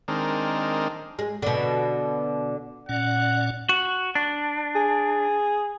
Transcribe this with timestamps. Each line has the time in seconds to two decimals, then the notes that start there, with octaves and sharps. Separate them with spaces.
0.08 D#3 G#3 C4 D4 A#4
1.19 G#3
1.42 B2 D3
2.89 A#2 C#4 D5 F#5
3.69 F#4
4.15 D4
4.76 G#4